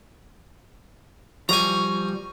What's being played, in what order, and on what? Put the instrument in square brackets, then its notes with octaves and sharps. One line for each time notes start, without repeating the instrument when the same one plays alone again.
[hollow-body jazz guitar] F3 G3 [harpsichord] G#5 A#5 [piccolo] C#6